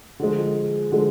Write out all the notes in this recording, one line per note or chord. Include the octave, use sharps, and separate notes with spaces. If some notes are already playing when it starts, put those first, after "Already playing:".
D3 F3 G#3
D3 F3 G#3